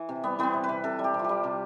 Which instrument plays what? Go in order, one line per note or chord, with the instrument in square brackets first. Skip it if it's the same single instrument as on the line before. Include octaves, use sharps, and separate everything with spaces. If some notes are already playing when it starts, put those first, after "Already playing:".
Already playing: [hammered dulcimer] E3
C3
G3 B3
E3 B3 C4
C3
B4
C3
C3 A4
G3
G4
C3
F4
G3 G4
C3